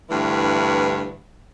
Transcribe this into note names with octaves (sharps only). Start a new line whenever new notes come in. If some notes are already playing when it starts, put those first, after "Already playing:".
D2 G2 E3